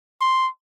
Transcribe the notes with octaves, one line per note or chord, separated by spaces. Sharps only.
C6